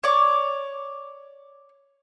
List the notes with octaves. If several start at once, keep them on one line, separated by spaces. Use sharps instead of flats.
C#5 D5